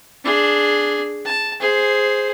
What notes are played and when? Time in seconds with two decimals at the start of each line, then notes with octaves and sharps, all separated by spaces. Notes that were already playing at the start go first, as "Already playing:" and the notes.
0.24 D4 G#4
1.25 A5
1.60 G#4 C5